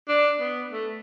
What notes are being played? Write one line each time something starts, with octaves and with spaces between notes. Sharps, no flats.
D4
B3
A3